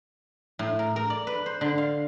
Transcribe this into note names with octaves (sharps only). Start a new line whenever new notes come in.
A2
A#4
A#4
D5
B4
C5
D3
F5